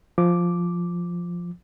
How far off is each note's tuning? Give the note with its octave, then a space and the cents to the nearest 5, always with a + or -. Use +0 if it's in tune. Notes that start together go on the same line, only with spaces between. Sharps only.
F3 +0 D6 +0